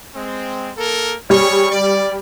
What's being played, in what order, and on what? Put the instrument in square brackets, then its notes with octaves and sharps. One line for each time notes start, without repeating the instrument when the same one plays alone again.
[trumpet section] G#3 C4
A#3 A4 A#4
[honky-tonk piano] G3 [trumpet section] G#4 C#5 C#6
[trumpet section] D5